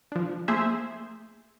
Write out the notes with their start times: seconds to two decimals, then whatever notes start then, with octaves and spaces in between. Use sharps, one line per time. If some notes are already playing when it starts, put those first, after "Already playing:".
0.12 F3 D4
0.48 A3 A#3 G#4 C5 E5